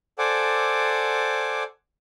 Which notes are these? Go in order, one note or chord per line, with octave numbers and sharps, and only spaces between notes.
A4 C5 D5 F#5 G#5 D6